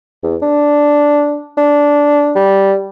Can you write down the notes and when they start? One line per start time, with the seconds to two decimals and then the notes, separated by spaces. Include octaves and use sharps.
0.23 E2
0.42 D4
1.58 D4
2.35 G3